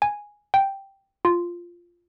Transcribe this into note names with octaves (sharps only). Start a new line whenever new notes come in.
G#5
G5
F4